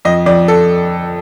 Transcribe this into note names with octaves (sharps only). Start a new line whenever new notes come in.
F2 D#5
F2 D5
A4